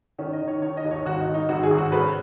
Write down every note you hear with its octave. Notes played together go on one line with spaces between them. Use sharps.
D#3 C#4
D#5
D#3
C#5
D#3 C#5
D#5
D#2
C#5
G#1 F#4
D#4
D#3
D#4
G#1 F#4
G#4
G#1
F#4
C#3 B4